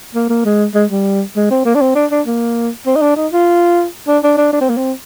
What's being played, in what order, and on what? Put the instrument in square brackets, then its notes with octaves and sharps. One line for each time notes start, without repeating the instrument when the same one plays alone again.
[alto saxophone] A#3
A#3
G#3
G#3
G3
G#3
C4
A#3
D4
C4
D4
D4
A#3
C4
D#4
D4
D#4
F4
D4
D4
D4
D4
C4
A#3
C4